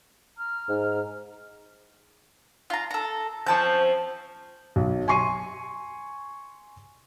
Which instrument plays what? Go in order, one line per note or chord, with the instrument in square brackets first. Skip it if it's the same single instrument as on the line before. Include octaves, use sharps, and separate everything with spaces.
[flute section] A#5 F6
[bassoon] G#2
[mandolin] F4 A#5
A4 A#5
[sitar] F3 C4 [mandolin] C#4 A5 G6
[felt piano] B1
G#5 C6 C#6 C7 D#7